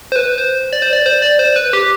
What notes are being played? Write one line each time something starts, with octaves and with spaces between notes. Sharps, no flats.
C5
B4
C5
D5
C5
D5
C5
D5
C5
B4
G4